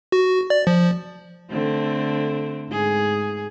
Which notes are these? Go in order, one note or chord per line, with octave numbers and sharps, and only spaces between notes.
F#4
D5
F3
D3 A3 C4
G#2 G#4